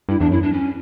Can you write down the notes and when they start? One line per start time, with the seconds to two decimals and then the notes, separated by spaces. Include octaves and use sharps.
0.09 G2 E4
0.20 E2 D4
0.31 F#2 E4
0.43 D4
0.52 C#4